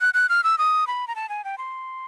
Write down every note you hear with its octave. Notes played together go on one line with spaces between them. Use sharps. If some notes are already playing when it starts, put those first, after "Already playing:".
F#6
F#6
F6
E6
D#6
B5
A#5
A5
G#5
G5
C6